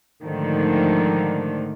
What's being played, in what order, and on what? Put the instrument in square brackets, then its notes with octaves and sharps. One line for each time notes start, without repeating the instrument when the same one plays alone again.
[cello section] G#2 D3 D#3 F3 A3